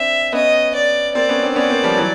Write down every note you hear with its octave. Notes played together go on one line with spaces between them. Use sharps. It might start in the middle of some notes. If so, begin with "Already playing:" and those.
Already playing: C4 D4 E5
B3 C#4 D#5
D5
A#3 C4 D5
B3 C#4
C4 D4
B3 C#4 D5
A#3 C4
F3 G3
E3 F#3